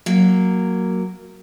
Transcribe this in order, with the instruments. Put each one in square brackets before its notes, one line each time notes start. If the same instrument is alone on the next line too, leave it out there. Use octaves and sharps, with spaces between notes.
[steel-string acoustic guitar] F#3 A#3